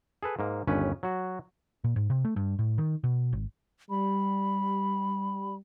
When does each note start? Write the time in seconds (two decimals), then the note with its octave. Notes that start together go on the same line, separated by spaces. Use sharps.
0.23 G#4 A4 B4
0.39 G#2 A#3
0.67 G1 D#2 C#4 B4
1.03 F#3 F#4
1.84 A#2
1.96 G#2
2.10 C3
2.25 A3
2.36 G2
2.59 A2
2.78 D#3
3.04 B2
3.33 G#1
3.90 G3 B5